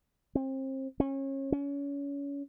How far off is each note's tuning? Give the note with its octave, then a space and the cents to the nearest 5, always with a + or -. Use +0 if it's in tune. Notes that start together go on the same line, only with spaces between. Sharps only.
C4 +30
C#4 -30
C#4 +30